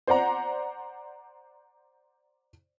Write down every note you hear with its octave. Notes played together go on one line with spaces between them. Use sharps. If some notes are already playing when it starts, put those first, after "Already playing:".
C5 D5 F#5 A#5